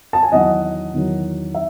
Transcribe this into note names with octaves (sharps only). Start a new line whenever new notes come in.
A5
G#5
E2 D#3 F#3 D#5 F#5
E2 D#3 F#3
E5